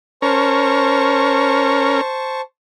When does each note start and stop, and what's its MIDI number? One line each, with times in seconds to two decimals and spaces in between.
0.22 2.01 61
0.22 2.01 70
0.22 2.41 72
0.22 2.41 81
0.22 2.41 85